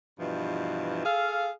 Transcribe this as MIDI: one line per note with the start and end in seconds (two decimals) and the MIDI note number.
0.19 1.01 43
0.19 1.01 47
0.19 1.01 52
0.19 1.01 53
1.05 1.50 68
1.05 1.50 69
1.05 1.50 77